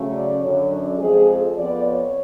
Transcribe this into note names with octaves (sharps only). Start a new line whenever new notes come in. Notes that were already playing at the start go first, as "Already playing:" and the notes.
Already playing: C#3 F#3 A3
D5
F#2 D3 F#3 C#5
D4
F2 F3 G#3 G#4
A4
F2 F3 B3 D5
C#5